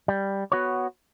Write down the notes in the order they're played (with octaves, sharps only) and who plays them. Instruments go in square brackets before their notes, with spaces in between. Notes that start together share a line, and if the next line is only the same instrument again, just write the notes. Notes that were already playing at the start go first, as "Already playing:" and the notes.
[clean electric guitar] G3
B3 F#4 C#5